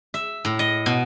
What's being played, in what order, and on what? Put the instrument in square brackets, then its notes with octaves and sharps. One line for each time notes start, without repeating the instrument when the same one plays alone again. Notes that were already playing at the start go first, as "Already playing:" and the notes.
[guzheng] E5
A2
D#5
B2